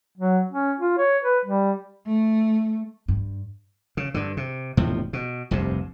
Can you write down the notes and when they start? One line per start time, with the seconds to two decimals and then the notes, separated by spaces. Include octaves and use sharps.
0.18 F#3
0.51 C#4
0.79 F4
0.98 C#5
1.23 B4
1.45 G3
2.06 A3
3.08 G2
3.97 C#3
4.14 G2 D3
4.37 C3
4.77 E1 A2 C3 F3
5.13 B2
5.51 F1 C2 G2 C3